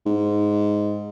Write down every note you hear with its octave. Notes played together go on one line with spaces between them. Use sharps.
G#2